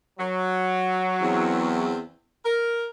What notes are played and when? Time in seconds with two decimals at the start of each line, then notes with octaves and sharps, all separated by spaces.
0.19 F#3
1.21 E2 C4
2.44 A#4